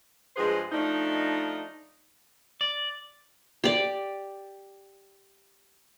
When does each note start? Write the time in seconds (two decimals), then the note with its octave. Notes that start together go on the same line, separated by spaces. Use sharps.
0.36 G2 F3 G#3 G#4 B4 C5
0.71 F3 A3 D4 D#4
2.61 D5
3.64 G4 D5